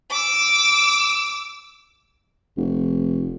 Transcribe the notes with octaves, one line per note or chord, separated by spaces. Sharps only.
D6 E6
F1